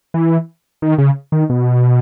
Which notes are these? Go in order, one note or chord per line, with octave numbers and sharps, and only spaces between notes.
E3
D#3
C#3
D#3
B2